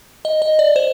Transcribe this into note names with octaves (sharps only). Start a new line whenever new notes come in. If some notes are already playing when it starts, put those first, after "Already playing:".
D#5
D#5
D5
C5